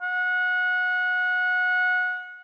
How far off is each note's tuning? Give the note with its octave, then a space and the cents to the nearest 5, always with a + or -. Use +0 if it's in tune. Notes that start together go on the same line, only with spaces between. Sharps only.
F#5 -25